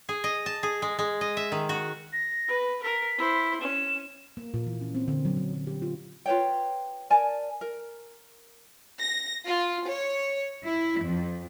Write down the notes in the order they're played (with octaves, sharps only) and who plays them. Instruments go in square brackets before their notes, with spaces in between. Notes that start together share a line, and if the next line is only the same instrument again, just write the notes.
[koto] G#4
D#5
A5
G#4
G#3
G#3
D#5
E5
D#3
F#4
[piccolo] A#6
[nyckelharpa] B4
[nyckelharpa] A#4 [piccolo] B6
[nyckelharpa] E4 C5
[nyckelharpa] C#4 [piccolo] E7
[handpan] A#3
A#2
E3
C#4
C4
D3
F#3
D3
F#3
G4
F4
[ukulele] F4 B4 C#5 G5
A#4 D5 G#5 A5
A#4
[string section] A#6
F4
C#5
E4
F2